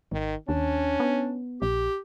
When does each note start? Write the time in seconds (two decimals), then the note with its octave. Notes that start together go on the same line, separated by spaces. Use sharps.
0.12 G#1 D#3
0.49 D#2 C#4 D4
1.00 B3
1.62 A#1 G4